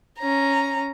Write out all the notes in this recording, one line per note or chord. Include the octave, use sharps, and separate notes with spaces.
C#4 A#5